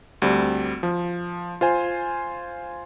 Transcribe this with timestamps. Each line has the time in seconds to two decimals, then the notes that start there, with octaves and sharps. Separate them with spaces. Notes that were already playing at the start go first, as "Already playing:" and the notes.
0.22 D2 G3 C4
0.83 F3
1.61 F4 C5 G#5